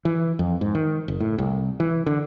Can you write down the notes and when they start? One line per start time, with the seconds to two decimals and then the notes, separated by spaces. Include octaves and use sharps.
0.05 E3
0.39 F2
0.61 G#2
0.75 D#3
1.08 F#1
1.20 A2
1.38 C2
1.80 E3
2.06 D3